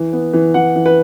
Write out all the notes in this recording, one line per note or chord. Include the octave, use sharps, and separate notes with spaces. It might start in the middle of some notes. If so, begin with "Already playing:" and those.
Already playing: E3
B3
E3
E3 F#5
E3
B4